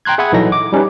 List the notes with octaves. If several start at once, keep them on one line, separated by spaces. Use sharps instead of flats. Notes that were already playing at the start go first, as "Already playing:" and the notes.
G5 A#5 C6 F#6 G#6
G#4 E5 F#5 B5 D#6 G#6
A#1 E3 F#3 D#4 A4 A#6
D6
G3 C#4 D#4 G4 B4